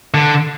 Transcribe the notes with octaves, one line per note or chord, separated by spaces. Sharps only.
D3